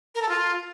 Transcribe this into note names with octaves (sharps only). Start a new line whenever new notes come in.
A#4
A4
F4